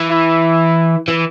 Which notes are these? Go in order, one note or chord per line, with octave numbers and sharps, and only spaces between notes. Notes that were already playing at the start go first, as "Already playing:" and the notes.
Already playing: E3
E4
E3